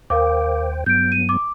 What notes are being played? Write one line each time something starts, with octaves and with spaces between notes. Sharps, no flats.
D#2 A#4 C5 F5 G5 D6
G2 F#3 B3 G6 D7
D#7
D6